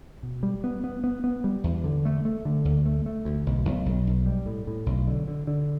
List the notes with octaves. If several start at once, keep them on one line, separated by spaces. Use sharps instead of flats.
B2
G3
B3
B3
B3
B3
G3
E2
D3
A3
A3
D3
D2
A3
A3
D2
B1
B1
B1
B1
G3
A2
A2
B1
D3
D3
D3